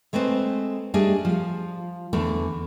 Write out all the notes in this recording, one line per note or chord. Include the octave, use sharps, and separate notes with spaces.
G#3 A3 C4 B4 C5
G3 A3 D4 G#4 D#5
F3
E2 D3 A3